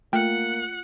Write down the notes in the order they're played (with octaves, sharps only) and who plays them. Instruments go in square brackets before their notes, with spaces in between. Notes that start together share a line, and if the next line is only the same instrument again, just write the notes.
[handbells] A3 G5 [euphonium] A#3 [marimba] F4 [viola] F#5